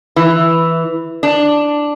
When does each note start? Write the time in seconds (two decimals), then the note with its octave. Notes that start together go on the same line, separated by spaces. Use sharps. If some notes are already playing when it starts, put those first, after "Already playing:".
0.16 E3
1.23 D4